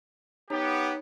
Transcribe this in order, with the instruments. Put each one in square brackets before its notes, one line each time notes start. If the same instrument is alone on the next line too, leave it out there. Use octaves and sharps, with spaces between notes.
[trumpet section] B3 G4 [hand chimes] D#4 C#5 A#5